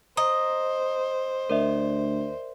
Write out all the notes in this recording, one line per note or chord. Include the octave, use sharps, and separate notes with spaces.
C5 D#5 A#5
D2 A#4 D5 E5